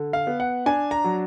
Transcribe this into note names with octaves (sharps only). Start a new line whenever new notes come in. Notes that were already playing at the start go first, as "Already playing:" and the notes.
Already playing: D3
F5
B3
F#5
D4 G#5
A#5
F#3